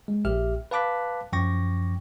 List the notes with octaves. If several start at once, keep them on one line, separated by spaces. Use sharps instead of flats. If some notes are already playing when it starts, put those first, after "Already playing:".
G#3
A#1 G4 E5 F6
B4 F5 A5 D6 F#6 B6
F#2 F3 G5 C#6 D6 A#6